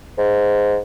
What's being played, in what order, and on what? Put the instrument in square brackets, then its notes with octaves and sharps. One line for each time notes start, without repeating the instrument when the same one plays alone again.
[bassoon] G#2